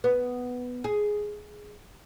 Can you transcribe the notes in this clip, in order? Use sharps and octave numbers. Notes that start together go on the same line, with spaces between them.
B3
G#4